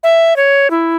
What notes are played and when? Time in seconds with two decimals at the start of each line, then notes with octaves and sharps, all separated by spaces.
0.03 E5
0.36 C#5
0.70 E4